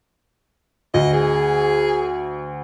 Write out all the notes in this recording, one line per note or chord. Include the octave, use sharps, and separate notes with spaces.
D2 D#5
G#4